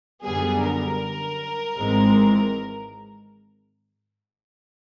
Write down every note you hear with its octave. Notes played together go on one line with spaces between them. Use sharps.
F#2 D3 G3 B3 G#4
A#4
G#1 G#2 E3 G#3 C4